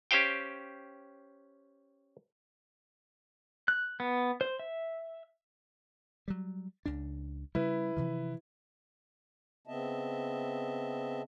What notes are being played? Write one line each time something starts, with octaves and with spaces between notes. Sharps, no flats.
C#4 G4 C5 F5 G5
F#6
B3
C5
E5
F#3 G3
C#2 C#3 D4
C#3 G3 E4 B4
C3 E3 F3
C#3 B3 C4 D#5 E5 A5